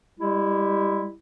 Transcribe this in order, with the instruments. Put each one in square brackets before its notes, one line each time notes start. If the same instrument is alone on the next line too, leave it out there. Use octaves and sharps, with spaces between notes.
[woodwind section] G3 G#3 E4 G4